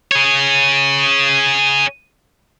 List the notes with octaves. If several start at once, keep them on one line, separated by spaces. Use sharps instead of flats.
G#4 C#5